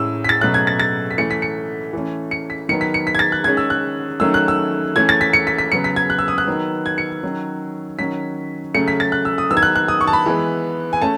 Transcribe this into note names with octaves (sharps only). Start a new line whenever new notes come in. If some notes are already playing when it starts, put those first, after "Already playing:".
Already playing: A2 G#3 C#4 E6
B6
A6
B2 F#3 A3 C#4 F#6
G#6
A6
A6
B6
E3 A3 C#4 C#7
B6
C#7
E3 A3 C#4
C#7
B6
D#3 F#3 B3 C#7
B6
C#7
B6
G#6
A6
F#6
D#3 G#3 C#4 G#6
E6
F#6
D#3 F#3 A3 C#4 E6
F#6
E6
E3 A3 C#4 G#6
A6
B6
C#7
B6
B6
C#3 F#3 B3 C#7
B6
G#6
F#6
E6
D#6
F#6
D#3 F#3 B3
G#6
C#7
D#3 F#3 C#4
D#3 F#3 C#4 B6
C#3 F#3 A3 C#4 C#7
B6
A6
F#6
E6
D#6
D#3 F#3 B3 E6
G#6
F#6
F#6
D#6
C#6
A5
B5
E3 G#3 B3
G#5
A3 C#4 A5